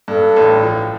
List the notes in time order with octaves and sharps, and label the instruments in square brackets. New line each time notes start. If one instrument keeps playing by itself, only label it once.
[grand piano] G2 [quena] A4
[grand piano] A1
F3